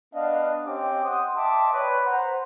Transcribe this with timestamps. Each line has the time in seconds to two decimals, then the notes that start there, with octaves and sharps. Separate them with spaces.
0.14 B3 D4 D#5 F5
0.66 C4 C#4 G4 D#5 G5 D6
1.04 F#5 G5 C6 D#6
1.36 D#5 E5 G5 A5 C6 D6
1.73 B4 C#5 D5
2.04 C5 F#5 A#5